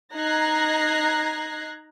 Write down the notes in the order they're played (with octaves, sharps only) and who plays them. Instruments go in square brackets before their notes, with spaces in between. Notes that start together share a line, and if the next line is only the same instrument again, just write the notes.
[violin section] D#4 A#5 F#6 G#6 A#6 C7